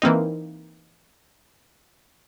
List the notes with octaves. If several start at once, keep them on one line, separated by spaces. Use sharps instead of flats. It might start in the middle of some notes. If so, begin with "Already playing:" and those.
E3 A#3 C4 D#4